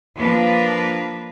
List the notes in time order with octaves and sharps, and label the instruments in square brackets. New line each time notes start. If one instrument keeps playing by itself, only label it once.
[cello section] F3 A#3 D4 B4